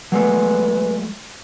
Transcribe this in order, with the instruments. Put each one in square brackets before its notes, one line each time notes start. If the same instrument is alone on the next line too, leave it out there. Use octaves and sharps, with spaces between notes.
[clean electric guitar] F#3 G#3 A3 [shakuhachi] B4